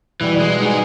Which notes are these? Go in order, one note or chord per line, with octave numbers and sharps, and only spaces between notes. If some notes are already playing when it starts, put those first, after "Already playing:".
B2 E3 G3
G#3
D#4 G#4